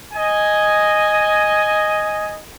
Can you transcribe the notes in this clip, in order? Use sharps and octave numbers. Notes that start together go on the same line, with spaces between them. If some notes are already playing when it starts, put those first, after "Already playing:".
D#5 G#5